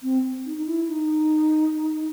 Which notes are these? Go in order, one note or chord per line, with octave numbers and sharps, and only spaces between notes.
C4
D#4
D#4
E4
D#4